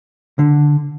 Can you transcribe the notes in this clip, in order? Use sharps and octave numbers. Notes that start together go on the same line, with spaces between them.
D3